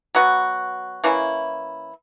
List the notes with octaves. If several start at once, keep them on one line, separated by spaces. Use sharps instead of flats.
F#3 B3 F#4
E3 A#3 C#4 E4